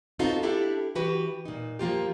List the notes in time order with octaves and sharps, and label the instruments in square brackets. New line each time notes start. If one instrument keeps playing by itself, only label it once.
[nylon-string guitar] B3 C4 D#4 F4 F#4 A4
D4 E4 G4 A4
E3 F#4 G4 B4
A#2 D#4
F3 A#3 F4 G4